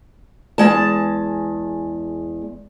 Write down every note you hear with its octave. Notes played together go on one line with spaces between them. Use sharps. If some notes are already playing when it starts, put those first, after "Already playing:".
E2 G#3 A5